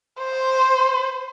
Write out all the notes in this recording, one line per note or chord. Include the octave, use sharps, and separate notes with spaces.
C5